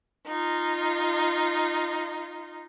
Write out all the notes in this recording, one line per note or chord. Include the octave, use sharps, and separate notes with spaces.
D#4 F4